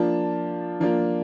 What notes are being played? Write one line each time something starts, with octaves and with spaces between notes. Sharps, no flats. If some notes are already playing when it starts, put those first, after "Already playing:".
Already playing: F3 A#3 D4 F4 A5
F3 A#3 D4 F4